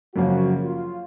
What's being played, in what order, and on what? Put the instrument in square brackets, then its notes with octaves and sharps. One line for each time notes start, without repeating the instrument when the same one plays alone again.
[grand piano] F#2 C#3 F3 A#3 C#4 [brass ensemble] F#4
[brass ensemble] F4